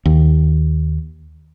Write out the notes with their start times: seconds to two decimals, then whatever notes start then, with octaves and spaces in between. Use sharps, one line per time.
0.06 D#2